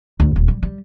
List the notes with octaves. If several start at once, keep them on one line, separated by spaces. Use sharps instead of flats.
D2
D#1
G3
G3